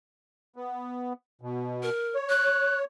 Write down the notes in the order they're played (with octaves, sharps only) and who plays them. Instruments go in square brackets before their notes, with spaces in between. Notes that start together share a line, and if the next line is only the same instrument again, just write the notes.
[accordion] B3
B2
[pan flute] A#4
[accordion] C#5
[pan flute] F#6